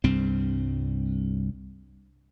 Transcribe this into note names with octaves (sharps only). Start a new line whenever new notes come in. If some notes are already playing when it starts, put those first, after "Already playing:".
C2 G2 C4